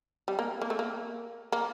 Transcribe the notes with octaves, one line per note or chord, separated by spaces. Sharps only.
G3
A#3
A#3
A3
A#3
A#3